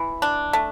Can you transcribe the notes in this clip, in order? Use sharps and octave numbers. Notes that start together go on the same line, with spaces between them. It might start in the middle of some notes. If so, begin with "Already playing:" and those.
Already playing: E3
D4
A3